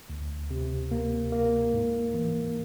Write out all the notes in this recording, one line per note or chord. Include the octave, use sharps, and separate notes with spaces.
D2
C3
A#3
A#3
G#2
E3